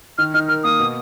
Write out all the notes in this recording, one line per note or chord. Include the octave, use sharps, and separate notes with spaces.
D#3 F6
D#4 F6
A#4 F6
A#3 D#6
B2